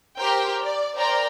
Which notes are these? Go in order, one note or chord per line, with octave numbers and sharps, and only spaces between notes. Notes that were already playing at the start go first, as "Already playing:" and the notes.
G4 A#4 C5 G5
D5
A#4 C5 D5 G5 A#5